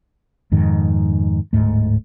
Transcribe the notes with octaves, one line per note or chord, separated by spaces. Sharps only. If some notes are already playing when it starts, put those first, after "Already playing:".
F2 G#2 D#3
D1 C2 G#2 A3